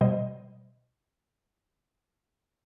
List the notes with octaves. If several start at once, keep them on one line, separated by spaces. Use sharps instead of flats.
B2 G3 C5 D#5